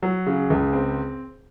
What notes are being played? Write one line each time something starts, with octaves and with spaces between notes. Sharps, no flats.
F#3
C#3
C#2
C4